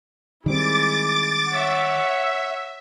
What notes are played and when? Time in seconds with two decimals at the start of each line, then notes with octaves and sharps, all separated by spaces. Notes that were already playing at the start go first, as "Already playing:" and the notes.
0.46 D#3 G3 G#3 C4 E4 D6 A6
1.51 C#5 E5 F#5